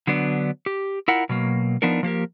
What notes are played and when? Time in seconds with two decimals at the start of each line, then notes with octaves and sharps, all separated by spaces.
0.07 D3 F#3 B3 D4
0.66 G4
1.08 E4 F4 A#4 F#5
1.29 B2 F#3 A#3
1.82 F3 B3 D4 D#4 A#4
2.03 F3 A#3 G4 A#4